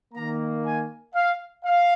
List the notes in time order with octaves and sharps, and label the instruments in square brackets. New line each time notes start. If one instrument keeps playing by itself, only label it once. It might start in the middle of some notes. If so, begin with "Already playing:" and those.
[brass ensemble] D#3 A#3 A#5
G#5
F5
F5